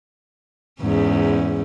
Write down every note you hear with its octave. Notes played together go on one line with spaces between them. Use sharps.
E2 G#2 C#4